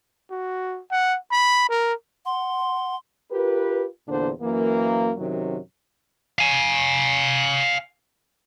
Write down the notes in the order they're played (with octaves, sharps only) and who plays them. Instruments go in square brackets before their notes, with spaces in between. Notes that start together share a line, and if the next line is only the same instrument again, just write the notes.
[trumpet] F#4
F#5
B5
A#4
[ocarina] F#5 [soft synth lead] C6
[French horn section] F4 G4 A#4 B4
E2 A#2 D3 D4 C5
F#2 E3 A#3
F#2 C3 D#3 F#3
[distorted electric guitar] F5 G#5